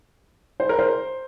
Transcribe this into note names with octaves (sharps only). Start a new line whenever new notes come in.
C5
A#4
C5